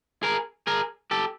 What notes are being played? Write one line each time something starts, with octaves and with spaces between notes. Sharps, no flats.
G#4 A#4
G#4 A#4
G4 A4